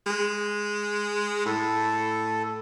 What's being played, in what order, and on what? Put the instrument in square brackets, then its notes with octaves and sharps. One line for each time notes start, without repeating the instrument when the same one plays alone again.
[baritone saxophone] G#3
[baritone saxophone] A2 [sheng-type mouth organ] A4